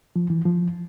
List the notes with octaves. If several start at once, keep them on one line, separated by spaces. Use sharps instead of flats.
F3
E3
F3